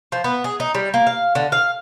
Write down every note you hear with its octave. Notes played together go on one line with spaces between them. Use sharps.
F3
B3
G#4
D#4
G3
A#3
F5
D3
F5